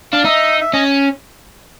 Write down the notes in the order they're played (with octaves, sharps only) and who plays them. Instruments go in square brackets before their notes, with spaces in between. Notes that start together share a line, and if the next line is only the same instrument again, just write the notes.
[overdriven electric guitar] D4 [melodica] F5
[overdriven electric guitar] D#4 [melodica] E5
[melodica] E5
[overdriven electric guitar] C#4 [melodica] D#5